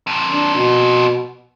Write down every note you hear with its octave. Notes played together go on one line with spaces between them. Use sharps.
F2 A#2
D4
B2